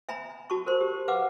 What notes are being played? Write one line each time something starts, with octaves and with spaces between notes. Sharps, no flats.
E5 G#5 A#5 B5
F#4 A5 B5 C#6
A#4 C5 C6
G4
B4 F5 F#5 D6